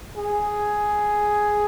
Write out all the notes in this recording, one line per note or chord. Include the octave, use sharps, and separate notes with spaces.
G#4